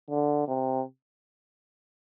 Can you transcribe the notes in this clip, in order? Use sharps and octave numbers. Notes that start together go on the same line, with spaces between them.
D3
C3